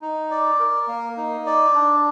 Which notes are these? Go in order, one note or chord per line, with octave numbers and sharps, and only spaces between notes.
D#4
D5
A#4
A#3
D#4
D5
D4